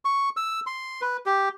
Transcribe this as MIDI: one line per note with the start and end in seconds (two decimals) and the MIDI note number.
0.05 0.29 85
0.37 0.60 88
0.67 1.01 84
1.01 1.17 71
1.26 1.49 67